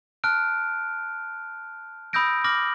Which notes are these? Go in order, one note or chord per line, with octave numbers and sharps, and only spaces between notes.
A5 F6 F#6 D7
B5 D#6 E6 G6 A#6 D7
D6 F6 A#6 F#7